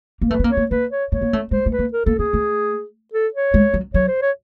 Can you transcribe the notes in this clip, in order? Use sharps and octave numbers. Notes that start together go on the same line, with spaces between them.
A#3
A3 B4
B3
A#3
C#5
A#3
A#3 B4
C#5
A3 C#5
A#3
A3
G#3 C5
A3
B4
A#3
A#4
A#3 A4
A#3 G#4
A3
A4
C#5
G#3
F#3
F#3 C#5
C5
C#5